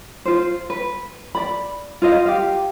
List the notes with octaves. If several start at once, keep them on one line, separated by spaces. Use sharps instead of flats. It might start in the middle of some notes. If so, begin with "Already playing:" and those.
F4 C5
B4
D5 B5
F4 C5 D#5 F5
G4 F5